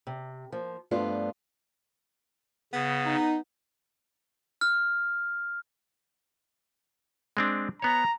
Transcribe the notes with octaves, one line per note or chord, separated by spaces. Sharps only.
C3
F3 A#3
G2 F3 A3 B3 D4 F4
C#3 B3
D#4
F6
G#3 C4 D4
B3 C#5 A#5